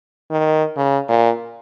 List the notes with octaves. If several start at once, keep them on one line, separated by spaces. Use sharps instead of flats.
D#3
C#3
A#2